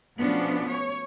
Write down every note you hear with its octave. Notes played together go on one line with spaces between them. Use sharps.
B2 F3 A3 B3 C#4 D4
C#5